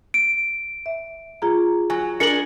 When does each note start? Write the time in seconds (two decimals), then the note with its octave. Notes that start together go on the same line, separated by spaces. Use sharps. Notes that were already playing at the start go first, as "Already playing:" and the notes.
0.14 D7
0.86 E5
1.42 F4 G#4 A#5
1.90 F#3 G#5
2.20 D4 G#4 A#4 C#7 F#7